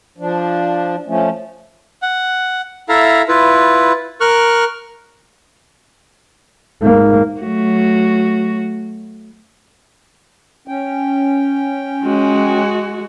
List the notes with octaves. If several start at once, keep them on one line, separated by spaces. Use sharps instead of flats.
F3 D4
F3 A3 C#4
F#5
E4 A4 E5 F5 A#5
E4 F4 B4
A#4 C#6 F6 F#6
G#2 A#3
F#3 A3 F#4
C#4 G5
G#3 F#4